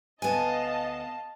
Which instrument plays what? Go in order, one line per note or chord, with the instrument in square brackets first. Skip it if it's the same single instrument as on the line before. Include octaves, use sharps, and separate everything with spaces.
[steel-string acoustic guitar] D2 B3 G#5 [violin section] D#5 F5 A5